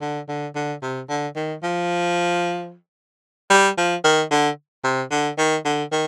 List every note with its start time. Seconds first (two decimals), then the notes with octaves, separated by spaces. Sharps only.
0.01 D3
0.28 D3
0.55 D3
0.82 C3
1.09 D3
1.36 D#3
1.63 F3
3.50 G3
3.77 F3
4.04 D#3
4.31 D3
4.84 C3
5.11 D3
5.38 D#3
5.65 D3
5.92 D#3